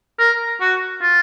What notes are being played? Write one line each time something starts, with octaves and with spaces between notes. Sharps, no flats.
A#4
F#4
F4